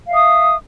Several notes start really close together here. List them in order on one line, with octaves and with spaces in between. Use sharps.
F5 E5 D#6